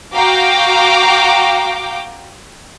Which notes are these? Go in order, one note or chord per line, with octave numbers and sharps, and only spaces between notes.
F#4 F5 G5 A#5 D6